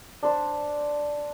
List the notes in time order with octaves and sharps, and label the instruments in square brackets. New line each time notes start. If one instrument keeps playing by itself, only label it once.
[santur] D4 C5